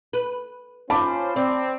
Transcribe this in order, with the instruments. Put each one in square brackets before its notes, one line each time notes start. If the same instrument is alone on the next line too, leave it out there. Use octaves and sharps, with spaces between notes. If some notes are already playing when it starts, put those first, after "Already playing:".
[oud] B4
[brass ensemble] C#4 F4 C5 [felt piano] A5 B5 D6
[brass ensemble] C4 [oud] D5